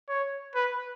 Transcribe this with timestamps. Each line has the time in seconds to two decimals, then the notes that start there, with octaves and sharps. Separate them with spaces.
0.09 C#5
0.55 B4